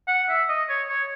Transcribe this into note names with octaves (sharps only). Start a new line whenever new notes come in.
F#5
E5
D#5
C#5
C#5